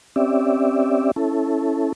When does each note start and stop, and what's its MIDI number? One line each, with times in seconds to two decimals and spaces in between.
0.16 1.11 60
0.16 1.11 61
0.16 1.11 67
0.16 1.11 74
0.16 1.11 76
1.16 1.93 61
1.16 1.93 64
1.16 1.93 69